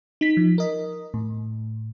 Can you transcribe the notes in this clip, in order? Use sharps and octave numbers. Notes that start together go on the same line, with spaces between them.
D#4 B6
F3
A#4 D#5
A2